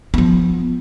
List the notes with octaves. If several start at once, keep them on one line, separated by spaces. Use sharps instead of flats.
F3 B3